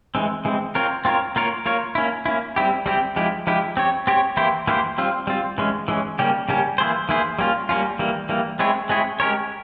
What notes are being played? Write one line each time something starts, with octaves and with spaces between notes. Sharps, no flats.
E3 G#3 C4
E3 G#3 C4
C4 F4 A#4 C#5
C4 F4 A#4 C#5
A#3 F4 A#4 C#5
A#3 F4 A#4 C#5
A#3 C#4 E4
A#3 C#4 E4
G3 C4 E4 G4
G3 C4 E4 G4
F3 G#3 E4 G4
F3 G#3 E4 G4
C4 G4 C#5
C4 G4 C#5
E3 A#3 E4 G4 C5
E3 A#3 E4 G4 C5
G3 C4 F4
G3 C4 F4
E3 G#3 C#4
E3 G#3 C#4
C#3 G3 A#3 C#4 G4
C#3 G3 A#3 C#4 G4
E3 A#3 E4 G#4 C5
E3 A#3 E4 G#4 C5
G3 A#3 C#4 F4
G3 A#3 C#4 F4
E3 G3 A#3
E3 G3 A#3
G#3 C4 E4 G#4 C#5
G#3 C4 E4 G#4 C#5
G#3 C#4 G4 A#4 C#5